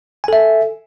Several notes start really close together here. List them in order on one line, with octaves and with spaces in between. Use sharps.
G#5 A4 E5